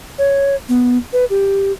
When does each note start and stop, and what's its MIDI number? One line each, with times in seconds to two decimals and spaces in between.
0.18 0.56 73
0.69 0.97 59
1.13 1.25 71
1.30 1.72 67